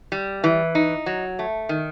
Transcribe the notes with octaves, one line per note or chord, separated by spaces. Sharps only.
G3
E3
D#4
F#3
A3
D#3